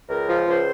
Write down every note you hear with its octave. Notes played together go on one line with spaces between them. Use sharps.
C#2 A#4
F3
C#2 C5